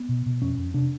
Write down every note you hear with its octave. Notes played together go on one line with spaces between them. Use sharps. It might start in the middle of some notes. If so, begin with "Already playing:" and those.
Already playing: B3
B2
B2
F2 C#4
F2
C3 D4